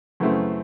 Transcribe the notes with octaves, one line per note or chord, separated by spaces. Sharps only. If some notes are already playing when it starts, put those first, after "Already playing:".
F#2 C#3 E3 A3 C4